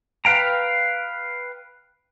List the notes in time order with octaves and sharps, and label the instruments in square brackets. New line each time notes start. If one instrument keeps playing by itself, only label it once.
[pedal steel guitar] B4 F5 G5 A#5